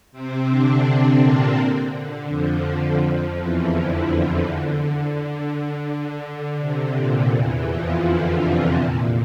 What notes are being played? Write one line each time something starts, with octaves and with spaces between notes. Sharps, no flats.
C3 C4
D3 D4
D3 D4
A#2 A#3
D3
F2 F3
F2 F3
E2 E3
D3
E2 E3
D3
C3
A#2
E2 E3
F2 F3
D3
C3
A#2